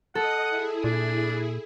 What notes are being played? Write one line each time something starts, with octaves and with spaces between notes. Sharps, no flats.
A4 D#5 F#5 D#6
E4 G#4
A#2 D4